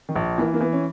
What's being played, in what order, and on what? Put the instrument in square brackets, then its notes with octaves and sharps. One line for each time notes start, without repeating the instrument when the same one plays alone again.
[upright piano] D#3
[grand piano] A#1
[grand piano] E3 [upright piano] A#3
[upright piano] A#3
[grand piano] E3 [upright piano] B3
[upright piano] C#4